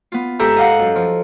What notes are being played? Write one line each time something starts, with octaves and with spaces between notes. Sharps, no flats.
B3 F4
G#2 G4 A4 E5 A#5 G6
D#5 F5 F#5
F#2
F3